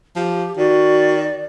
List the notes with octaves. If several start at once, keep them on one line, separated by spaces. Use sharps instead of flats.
F3 G4
D#3 F#4 D5